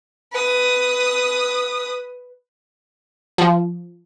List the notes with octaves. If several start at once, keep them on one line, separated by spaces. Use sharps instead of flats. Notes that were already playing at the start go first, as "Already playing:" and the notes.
B4 D#6
F3